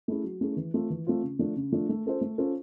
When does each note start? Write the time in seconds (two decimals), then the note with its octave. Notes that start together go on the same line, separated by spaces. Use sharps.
0.08 A3 C#4 E4 G#4
0.24 F#3
0.41 A3 C#4 E4 G#4
0.57 E3
0.74 A3 C4 F4
0.90 E3
1.07 A3 C4 F4
1.23 C#3
1.39 F3 A3 D4
1.56 C#3
1.72 F3 A3 D4
1.89 A3
2.06 C#4 F4 A4 C5
2.21 A3
2.38 C#4 F4 A4 C5